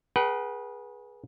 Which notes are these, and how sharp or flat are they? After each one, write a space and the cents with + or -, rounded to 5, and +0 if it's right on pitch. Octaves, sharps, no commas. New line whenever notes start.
G#4 +0 B4 -30 F#5 +40